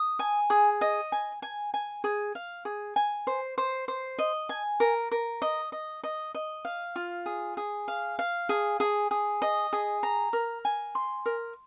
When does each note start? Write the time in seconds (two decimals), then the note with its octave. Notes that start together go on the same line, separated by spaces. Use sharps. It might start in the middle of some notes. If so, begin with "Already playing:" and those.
Already playing: D#6
0.19 G#5
0.50 G#4
0.81 D#5
1.12 G#5
1.42 G#5
1.74 G#5
2.04 G#4
2.35 F5
2.65 G#4
2.96 G#5
3.27 C5
3.58 C5
3.88 C5
4.19 D#5
4.49 G#5
4.80 A#4
5.11 A#4
5.42 D#5
5.72 D#5
6.04 D#5
6.35 D#5
6.65 F5
6.96 F4
7.26 G#4
7.57 G#4
7.88 F5
8.19 F5
8.49 G#4
8.80 G#4
9.11 G#4
9.42 D#5
9.73 G#4
10.03 A#5
10.33 A#4
10.65 G#5
10.95 C6
11.26 A#4